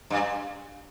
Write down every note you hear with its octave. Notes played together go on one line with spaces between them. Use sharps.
G2